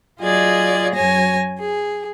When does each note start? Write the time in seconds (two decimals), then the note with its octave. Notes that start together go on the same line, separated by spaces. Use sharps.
0.21 F#3 F4 G#4 D5 D#5 G#6
0.94 F#2 F#3 C#5 G#5 A#6
1.59 G#4